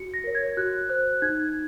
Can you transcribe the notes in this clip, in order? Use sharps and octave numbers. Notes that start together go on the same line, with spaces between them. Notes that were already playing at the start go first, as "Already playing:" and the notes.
Already playing: F#4 C#7
A#6
A#4 C#5
G#6
F#4 F#6
C5 F#6
D#4 G#6